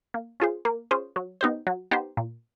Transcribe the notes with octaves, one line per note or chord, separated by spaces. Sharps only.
A#3
C#4 F4 G#4 C5
A#3
C#4 F4 G#4 C5
F#3
B3 D#4 G4 C5
F#3
B3 D#4 G4 C5
A#2